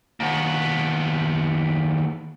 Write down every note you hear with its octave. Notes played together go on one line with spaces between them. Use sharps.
D#2 B3